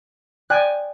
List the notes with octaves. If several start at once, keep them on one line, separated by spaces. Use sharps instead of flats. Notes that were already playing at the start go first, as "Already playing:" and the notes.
D5 G5 G#5 F#6